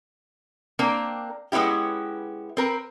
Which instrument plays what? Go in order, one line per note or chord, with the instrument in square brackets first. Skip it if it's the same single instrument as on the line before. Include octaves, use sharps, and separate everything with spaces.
[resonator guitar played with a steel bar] A#3 C4 D4 A#4
G#3 B3 C#4 E4 G4
C4 A#4 B4